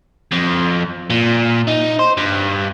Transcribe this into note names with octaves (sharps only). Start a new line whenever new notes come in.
F2
A#2
D#4
C5
G2